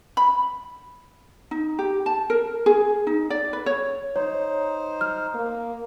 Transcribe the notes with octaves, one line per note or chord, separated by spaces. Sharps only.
B5
D#4
G4
A5
A#4
G#4
D#4
D5
B4
C#5
D#4 C5 C#5
F6
A#3